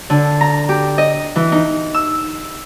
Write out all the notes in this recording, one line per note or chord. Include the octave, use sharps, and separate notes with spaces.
D3
A#5
G4
D#5
E3
D#4
E6